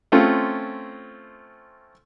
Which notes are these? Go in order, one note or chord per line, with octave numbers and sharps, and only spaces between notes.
A3 C4 C#4 F4